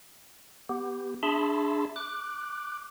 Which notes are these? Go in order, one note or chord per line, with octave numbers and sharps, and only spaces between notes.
B3 G4
D4 G#4 E5 A5 B5 C6
D6 F#6